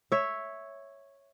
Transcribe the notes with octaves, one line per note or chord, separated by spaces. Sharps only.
C#5 E5